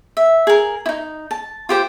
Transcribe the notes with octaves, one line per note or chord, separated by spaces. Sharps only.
E5
G#4 A#4
D#4 E4
A5
F4 G4 C5